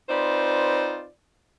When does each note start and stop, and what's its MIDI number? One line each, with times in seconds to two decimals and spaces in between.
0.09 1.06 60
0.09 1.06 63
0.09 1.06 65
0.09 1.06 71
0.09 1.06 72
0.09 1.06 74